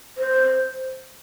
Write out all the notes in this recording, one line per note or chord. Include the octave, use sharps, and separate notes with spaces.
C5